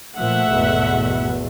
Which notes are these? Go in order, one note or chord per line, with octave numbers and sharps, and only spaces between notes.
A#2 F3 A3 E5 F#5
G#1 E2 B2